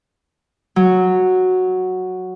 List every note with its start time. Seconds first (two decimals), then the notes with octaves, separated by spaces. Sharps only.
0.76 F#3